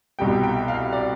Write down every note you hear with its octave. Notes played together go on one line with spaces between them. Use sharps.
C2 B2 G3 G5
G5
F5
D5